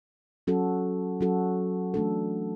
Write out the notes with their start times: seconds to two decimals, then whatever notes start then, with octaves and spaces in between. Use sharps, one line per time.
0.47 F#3 C#4 F#4 A4
1.21 F#3 C#4 F#4 A4
1.94 E3 A3 D4 A4